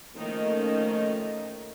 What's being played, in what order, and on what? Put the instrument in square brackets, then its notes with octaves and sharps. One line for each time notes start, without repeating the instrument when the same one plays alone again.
[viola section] D#3 F3 A3 A#3 C#4 D#4